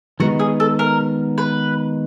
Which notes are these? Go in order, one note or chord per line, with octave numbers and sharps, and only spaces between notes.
D#3 G#3 B3 D#4 F#4
G#4
A4
A#4
B4